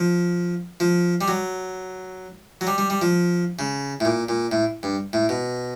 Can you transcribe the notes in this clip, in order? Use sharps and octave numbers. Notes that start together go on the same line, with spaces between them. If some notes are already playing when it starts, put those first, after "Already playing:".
Already playing: F3
F3
G3
F#3
F#3
G3
G3
G3
F3
C#3
A2
A#2
A#2
A2
G2
A2
B2